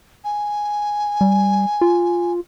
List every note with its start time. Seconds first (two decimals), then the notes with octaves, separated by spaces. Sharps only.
0.24 G#5
1.21 G3
1.81 F4